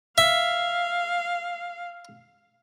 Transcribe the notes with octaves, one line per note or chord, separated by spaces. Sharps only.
E5 F5